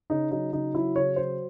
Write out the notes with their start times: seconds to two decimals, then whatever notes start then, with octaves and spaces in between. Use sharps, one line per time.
0.10 C#3 D#4
0.31 F#3 D#4
0.52 C#3 D#4
0.75 F#3 E4
0.95 C#3 C#5
1.16 F#3 C5